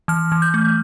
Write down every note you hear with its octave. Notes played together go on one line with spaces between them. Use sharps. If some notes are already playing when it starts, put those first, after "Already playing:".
E3 F6
E3
G6
A3